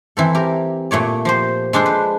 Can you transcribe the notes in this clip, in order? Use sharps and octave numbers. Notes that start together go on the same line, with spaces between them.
E3 C4 A4
G4 A#4
A#2 A3 C#5 D5
F3 G4 C5
G#3 D4 A4 C5
B4